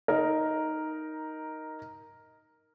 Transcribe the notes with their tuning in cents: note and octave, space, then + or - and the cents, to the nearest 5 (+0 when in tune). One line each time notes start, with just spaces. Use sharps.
D#4 +5 A#4 +0